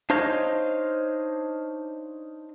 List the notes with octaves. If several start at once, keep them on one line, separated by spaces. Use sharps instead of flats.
D4 D#4 C5 C#5 D#5 F5